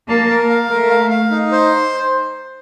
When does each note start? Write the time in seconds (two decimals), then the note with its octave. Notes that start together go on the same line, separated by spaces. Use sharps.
0.08 A#3 A5
0.29 A#4
0.50 F5
0.70 A3 A#4
0.90 F5
1.10 F5
1.31 D#4
1.51 C5